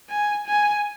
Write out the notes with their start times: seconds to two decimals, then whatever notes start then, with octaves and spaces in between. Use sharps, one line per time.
0.10 G#5
0.47 G#5